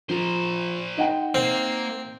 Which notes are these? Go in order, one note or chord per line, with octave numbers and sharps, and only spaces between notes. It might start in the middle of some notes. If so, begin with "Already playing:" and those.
F3 A#4 C5
D#4 F#5 G5
A#3 C4